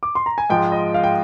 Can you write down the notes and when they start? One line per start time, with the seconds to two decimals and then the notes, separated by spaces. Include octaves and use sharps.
0.03 D6
0.15 C6
0.26 A#5
0.38 G#5
0.50 G#2 F3 G#3 G5
0.72 D#5
0.94 F5
1.04 G5